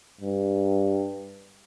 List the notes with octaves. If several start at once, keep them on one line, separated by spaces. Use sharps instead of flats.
G2